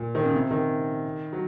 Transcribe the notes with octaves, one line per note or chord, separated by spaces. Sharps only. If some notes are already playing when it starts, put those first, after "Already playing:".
Already playing: A#2
D#3
C#3
C3
D#3
F#3